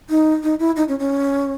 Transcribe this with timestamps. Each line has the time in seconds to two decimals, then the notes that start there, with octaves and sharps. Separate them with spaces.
0.10 D#4
0.43 D#4
0.60 E4
0.76 D#4
0.88 C#4
0.99 C#4